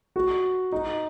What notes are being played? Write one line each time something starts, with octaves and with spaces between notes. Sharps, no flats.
F#4
D#4